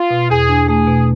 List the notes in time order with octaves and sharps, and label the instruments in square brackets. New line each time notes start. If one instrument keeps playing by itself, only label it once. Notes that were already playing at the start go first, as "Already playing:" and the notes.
Already playing: [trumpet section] F4
[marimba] B2
[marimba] E2 [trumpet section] G#4
[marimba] D4
[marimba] A3 [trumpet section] G#4
[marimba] B2